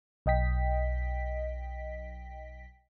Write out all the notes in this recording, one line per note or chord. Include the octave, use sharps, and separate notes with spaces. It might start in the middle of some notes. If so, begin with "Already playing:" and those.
B1 D#5 G5 B6